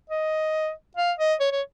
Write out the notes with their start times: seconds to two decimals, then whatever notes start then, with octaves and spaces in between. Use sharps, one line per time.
0.10 D#5
0.97 F5
1.19 D#5
1.40 C#5
1.52 C#5